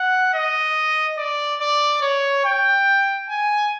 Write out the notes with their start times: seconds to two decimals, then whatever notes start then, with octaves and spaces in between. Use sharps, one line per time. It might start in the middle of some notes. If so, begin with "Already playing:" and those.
Already playing: F#5
0.34 D#5
1.18 D5
1.61 D5
2.02 C#5
2.45 G5
3.29 G#5